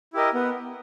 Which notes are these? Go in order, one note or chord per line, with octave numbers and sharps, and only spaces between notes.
E4 G4 A#4 D#5
B3